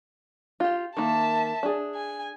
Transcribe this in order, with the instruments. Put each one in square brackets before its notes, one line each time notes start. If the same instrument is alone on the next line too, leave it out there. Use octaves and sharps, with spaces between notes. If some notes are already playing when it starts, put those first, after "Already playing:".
[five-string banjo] F4 G4
[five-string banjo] D#3 A#3 [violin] E5 A5
[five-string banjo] D4 G#4
[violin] G#5